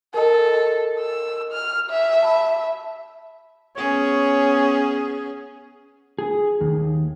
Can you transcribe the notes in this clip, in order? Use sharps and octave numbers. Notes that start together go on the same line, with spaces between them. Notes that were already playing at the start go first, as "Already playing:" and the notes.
A4 A#4 D#5
E6
F6
E5
A5 B5
B3 C#4 G#4 C#5
G#4
D#2